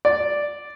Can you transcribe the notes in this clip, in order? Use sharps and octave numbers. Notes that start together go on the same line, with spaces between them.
D5